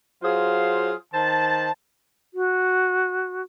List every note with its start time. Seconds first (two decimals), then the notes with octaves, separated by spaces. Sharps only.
0.23 F#3 F4 G#4 C5 F5
1.13 D#3 C5 A5
2.34 F#4